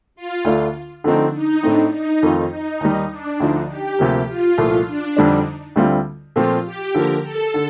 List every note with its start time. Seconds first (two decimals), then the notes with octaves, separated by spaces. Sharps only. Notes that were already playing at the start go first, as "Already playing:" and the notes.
0.16 F4
0.45 D2 D3 A3 D4 F4
1.04 D3 F3 A3 C4 D4 D#4
1.34 D#4
1.63 A2 A3 C4 D4 D#4
1.93 D#4
2.23 F2 D#3 A3 C4 F4
2.51 D#4
2.81 D#2 D#3 G3 D#4
3.11 D4
3.40 D2 D3 F3 D#4
3.70 G4
3.99 D2 C3 F3 A#3 G4
4.28 F4
4.58 C2 A#2 F3 A3 F4
4.87 D4
5.17 F2 D3 G3 D4 D#4
5.76 D2 D3 G3 C4 F4
6.35 A#2 F3 A3 C4 F4
6.65 G4
6.94 D3 F3 A#3 A#4
7.24 A4
7.54 D3